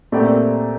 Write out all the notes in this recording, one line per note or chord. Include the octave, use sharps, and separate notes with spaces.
A#2 A3 C4 G4 D5